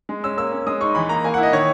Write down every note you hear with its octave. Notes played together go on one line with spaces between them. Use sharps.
G#3
C#4 E6
A#3 E6
C#4
G#3 D#6
D#4 C#6
E3 B5
A#3 A#5
A#3 G#5
F#5
E4
D#5
D#3 C#5